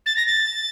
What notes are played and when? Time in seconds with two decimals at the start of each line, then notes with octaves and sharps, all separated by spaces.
0.06 A6
0.17 A#6
0.26 A6